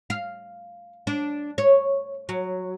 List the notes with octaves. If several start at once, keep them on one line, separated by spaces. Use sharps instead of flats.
F5
D4
C#5
F#3